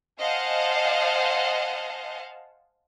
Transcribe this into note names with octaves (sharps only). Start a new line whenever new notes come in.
C5 D#5 F5 F#5 G#5 A5